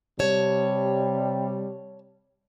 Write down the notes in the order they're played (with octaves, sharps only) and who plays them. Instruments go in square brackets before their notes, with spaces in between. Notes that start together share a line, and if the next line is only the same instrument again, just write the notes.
[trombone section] C3 G3 [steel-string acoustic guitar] C#5 A5